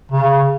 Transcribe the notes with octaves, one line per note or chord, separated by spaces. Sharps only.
C#3